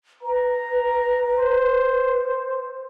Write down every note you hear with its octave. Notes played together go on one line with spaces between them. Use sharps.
B4 A#5
C5